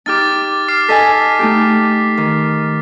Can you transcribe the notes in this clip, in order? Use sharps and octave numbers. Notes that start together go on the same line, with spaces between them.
D#4 G4 D6 F6 A6
D6 F6 C7
A4 D#5 G#5 B6
A3 D#4 G4
D#3